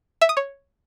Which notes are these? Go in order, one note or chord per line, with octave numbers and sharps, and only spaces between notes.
E5
D#6
C#5